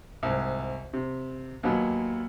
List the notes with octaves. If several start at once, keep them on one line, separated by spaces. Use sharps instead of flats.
C2 G#2
C3
D#2 A#2 F#3 B3